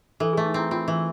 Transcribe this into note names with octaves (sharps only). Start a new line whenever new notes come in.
E3 A4
A3 G#4
D#4
C4 E4
C4 F4
E3